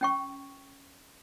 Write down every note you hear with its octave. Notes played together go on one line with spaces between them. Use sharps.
C#4 G5 C#6